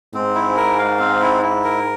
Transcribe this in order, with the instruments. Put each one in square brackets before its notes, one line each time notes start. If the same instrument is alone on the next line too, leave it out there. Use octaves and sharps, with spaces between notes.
[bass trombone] G#2 [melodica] C4
[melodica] E4
A#4
F5
C4
E4
E4
A#4